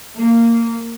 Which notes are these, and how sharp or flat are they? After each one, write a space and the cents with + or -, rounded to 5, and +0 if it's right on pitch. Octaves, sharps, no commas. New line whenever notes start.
A#3 -15